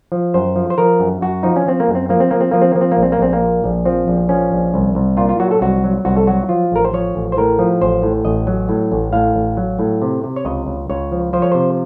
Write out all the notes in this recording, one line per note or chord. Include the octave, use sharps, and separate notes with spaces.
F3
F#2 C5
F3
C5
F3 A#4
F#2
F#2 F#4
F3 D#4
C#4
F3 C4
A#3
F#2
C4
F3 A#3
C4
F3 A#3
C4
F3 A#3
C4
F3 A#3
C4
A#3
A#1
C4
A#3
A#1 C4
A#3
A#2
A#1
F3 C4
A#1
F3 C#4
A#1
C2
C2
A#2 F4
F4
F#3 F#4
A4
C2 F#4
F#3
C2 F#4
A4
F#3 F#4
F3 F4
A1 A#4
C5
F3 C#5
A1
C5
A2 A#4
F3
A1 C5
A2
A1 D#5
F#3
A2
A1
A2 F5
A1
F#3
A2
C3
C3
C#5
C#2 D#5
C#2
C#2 C#5
F3
F3 C5
C#5
C3 C5